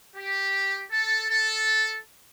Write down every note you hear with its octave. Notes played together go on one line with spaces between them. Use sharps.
G4
A4
A4